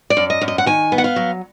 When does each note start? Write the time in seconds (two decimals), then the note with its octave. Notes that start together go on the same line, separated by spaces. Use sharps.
0.10 D5
0.17 F#2
0.30 D#5
0.41 F#2
0.48 D#5
0.58 F#5
0.66 D#3 G#5
0.92 B3
0.98 F#5
1.04 F5
1.16 F#3